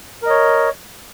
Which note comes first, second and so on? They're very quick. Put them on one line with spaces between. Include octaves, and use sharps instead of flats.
A#4 D#5 C#5